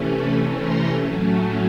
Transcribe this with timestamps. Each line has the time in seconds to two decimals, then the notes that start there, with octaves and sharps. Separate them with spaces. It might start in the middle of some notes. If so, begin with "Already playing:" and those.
Already playing: C3 E3 A3 C#4
0.12 A5 B5
0.56 A#5 C6
1.01 A2 F#3 A3 C#4